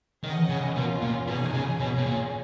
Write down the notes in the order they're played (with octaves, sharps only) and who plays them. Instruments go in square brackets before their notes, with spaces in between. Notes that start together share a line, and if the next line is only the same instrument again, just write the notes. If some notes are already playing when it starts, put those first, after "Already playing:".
[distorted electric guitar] D#3 [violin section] C#4 G#4 D#5 F#5
[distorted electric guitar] C#3
[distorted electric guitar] B2 [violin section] C#4 F4 A#4
[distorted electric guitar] A#2
[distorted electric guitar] B2 [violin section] D#4 G#4 C#5 G#5
[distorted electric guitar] C#3
[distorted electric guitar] B2 [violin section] C#4 G#4 C#5
[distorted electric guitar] B2
A#2